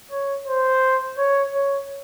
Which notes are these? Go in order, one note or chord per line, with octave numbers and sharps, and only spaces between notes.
C#5
C5
C#5
C#5